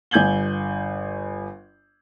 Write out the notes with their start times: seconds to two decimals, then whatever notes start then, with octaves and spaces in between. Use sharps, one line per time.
0.11 G1 G#5 G6 G#6 F#7 G7